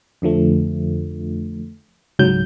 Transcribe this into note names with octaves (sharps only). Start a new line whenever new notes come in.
F2 D3 F3 A3
C#2 G#2 F#3 G6